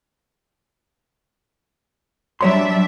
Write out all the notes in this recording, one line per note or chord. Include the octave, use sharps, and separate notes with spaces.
F#3 G3 D4 C#5 E5 C6